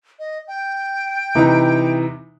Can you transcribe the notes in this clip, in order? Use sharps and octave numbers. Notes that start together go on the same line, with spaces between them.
D#5
G5
C3 E3 D#4